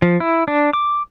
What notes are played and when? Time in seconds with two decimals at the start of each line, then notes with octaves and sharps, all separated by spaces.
0.02 F3
0.20 E4
0.48 D4
0.73 D6